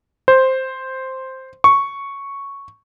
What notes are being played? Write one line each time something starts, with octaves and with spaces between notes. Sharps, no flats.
C5
C#6